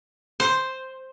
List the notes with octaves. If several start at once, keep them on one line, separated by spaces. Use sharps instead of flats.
C5